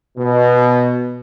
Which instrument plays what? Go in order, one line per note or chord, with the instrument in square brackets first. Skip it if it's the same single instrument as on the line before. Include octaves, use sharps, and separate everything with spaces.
[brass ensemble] B2